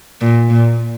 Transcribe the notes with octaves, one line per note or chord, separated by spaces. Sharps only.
A#2
A#2